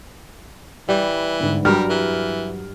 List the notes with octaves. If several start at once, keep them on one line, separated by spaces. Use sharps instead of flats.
E3 G3
G1 G#2
G2 F#3 G3 A#4 F6
E3